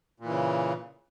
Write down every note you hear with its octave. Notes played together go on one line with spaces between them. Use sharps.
A#2 C#3 E3